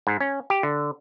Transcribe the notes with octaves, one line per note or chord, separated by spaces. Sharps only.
G#2
C#4
G4
D3